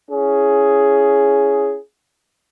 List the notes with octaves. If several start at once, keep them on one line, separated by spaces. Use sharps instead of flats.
C#4 E4 G#4